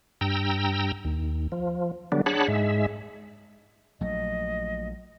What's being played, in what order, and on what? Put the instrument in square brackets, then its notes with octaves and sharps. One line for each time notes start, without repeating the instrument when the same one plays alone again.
[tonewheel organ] G2 G5 A#5 E6
D#2
F3
D3 F#3 G3 B3 D4
D4 G#4 C#5 F#5 A5 B5
G#2 G#3 E5
[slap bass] A#1 F#3 A3 [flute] D#5